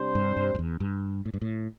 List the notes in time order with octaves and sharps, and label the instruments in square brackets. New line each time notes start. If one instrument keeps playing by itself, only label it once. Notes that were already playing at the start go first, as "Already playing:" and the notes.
Already playing: [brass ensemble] C3 G3 D4 C5
[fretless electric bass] G2
G2
G2
E2
G2
A2
G2
A2